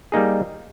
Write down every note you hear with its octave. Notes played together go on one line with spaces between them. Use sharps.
G3 A#3 D#4 G#4